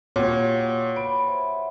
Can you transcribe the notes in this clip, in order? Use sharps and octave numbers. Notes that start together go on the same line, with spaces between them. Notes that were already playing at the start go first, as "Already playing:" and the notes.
A#2 F#4 G4 C#5
B4 D7
C5 E5 G#5